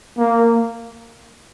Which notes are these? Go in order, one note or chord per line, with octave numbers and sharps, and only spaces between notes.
A#3